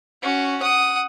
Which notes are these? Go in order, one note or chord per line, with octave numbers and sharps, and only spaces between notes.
C#4 F#4
F#5 D#6